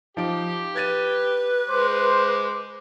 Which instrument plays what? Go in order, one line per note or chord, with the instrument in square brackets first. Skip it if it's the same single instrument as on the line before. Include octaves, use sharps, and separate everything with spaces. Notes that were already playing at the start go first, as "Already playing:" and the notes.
[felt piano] F3 D#4 D7 [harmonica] G4
[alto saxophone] B4 [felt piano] G#6 A6 D#7
[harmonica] G#3 D6 [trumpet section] C5